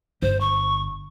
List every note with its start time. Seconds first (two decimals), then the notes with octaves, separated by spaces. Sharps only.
0.22 G1 C5
0.41 C#6